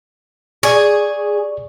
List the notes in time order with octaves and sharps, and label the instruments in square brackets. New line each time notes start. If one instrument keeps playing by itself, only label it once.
[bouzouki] G#4 [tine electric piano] D5 C#6